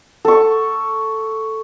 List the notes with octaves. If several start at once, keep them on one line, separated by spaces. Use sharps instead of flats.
A4 C#6